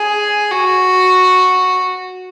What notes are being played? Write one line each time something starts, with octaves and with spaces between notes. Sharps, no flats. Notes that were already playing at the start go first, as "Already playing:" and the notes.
Already playing: G#4
F#4